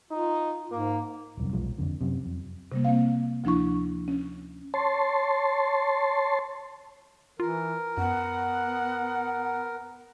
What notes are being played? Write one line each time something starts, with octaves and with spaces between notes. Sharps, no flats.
D#4 F4
G#2 A#3
D#1 C2 F#2
B1 F3 G#3
F#1 F2 D3
F#2 C3
F2
C3 G3 A#3
A#3 C4 F5
D2 F3 D4 E4 C#6
C#4
C#5 A5 C6
E3 F4 A#4
F#2 B3 F#5